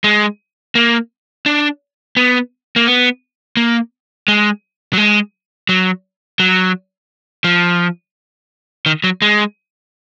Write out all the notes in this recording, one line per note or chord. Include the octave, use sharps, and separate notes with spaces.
G#3
A#3
D4
B3
A#3
B3
A#3
G#3
F#3
G#3
F#3
F#3
F3
D#3
F#3
G#3